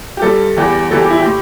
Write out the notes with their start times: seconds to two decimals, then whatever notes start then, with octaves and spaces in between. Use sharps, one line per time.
0.17 G4
0.22 G2 G3 A4
0.57 E2 E3 G3 G4
0.91 E2 E3 G3 A4
1.01 G4
1.10 E4
1.20 G4
1.25 A2